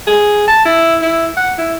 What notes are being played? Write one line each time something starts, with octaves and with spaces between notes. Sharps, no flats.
G#4
A5
E4
E4
F#5
E4